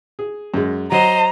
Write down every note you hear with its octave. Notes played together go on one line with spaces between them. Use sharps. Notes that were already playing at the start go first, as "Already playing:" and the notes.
G#4
F#2 G#3
F#3 C5 D#5 A#5